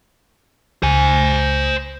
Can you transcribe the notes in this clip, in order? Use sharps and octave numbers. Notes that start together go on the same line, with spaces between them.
C#2 C5 G#5